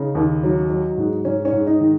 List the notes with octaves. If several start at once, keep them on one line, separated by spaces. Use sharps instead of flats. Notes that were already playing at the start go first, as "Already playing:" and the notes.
Already playing: C#3 D#4
D#2
F#3
F#3
G#2
G#2 C#4
C#4
G#2
D#4
D#3